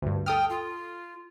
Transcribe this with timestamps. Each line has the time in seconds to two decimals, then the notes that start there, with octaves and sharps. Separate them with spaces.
0.02 D2 G2
0.26 A4 G5 D#6 F6
0.50 F4